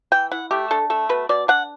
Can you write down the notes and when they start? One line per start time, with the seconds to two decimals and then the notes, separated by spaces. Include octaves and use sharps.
0.12 E3 G5
0.31 E4 F#5
0.51 A3 G4
0.71 D4 A4
0.90 A3 A4
1.09 B2 B4
1.29 B2 D5
1.48 D4 F#5